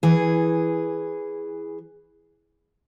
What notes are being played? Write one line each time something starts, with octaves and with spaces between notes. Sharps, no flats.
E3 G#4